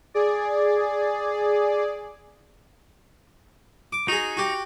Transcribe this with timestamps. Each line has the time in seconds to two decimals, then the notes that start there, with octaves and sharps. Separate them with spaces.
0.14 G#4 D5
3.93 D6
4.08 D#4 F#4 G#4
4.37 F#4 G4